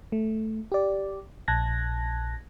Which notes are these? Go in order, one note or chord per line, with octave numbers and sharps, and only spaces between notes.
A3
G4 D5
A#1 A5 F#6 G#6 A#6